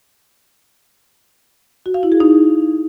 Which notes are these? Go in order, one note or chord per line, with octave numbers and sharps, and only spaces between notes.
F#4
F5
E4
G#4
D#4